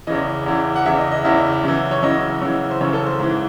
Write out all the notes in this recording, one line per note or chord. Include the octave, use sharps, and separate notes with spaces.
E2 C#3 E3 D#5
E2 C#3 E3
F#5
E2 C#3 E3 E5
D#5
D#5
E2 C#3 E3 E5
F#2 C#3 E3
C#5
F#2 C#3 E3 D#5
F#2 C#3 E3
C5
F#2 C#3 E3 C#5
A4
C5
G#2 E3